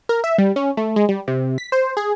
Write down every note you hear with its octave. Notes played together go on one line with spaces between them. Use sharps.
A#4
E5
G3
C#4
A3
G#3
G3
C3
B6
C5
G#4